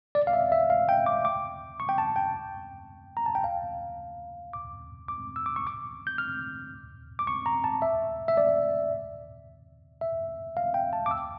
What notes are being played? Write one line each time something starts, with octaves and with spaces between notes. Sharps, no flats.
D5
F5
E5
E5
F5
G5
D6
D6
C#6
G5
A5
G5
A#5
A5
G5
F5
D6
D6
E6
D6
C#6
D6
G6
F6
D6
C#6
A#5
A5
E5
E5
D5
E5
F5
G5
A5
D6
E6